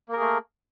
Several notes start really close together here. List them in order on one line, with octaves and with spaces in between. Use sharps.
A#3 A#4 G#4 A3